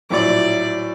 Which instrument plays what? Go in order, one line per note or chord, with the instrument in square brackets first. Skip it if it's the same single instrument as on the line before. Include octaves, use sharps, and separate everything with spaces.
[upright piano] A#1 A2 F#3 [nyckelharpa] D5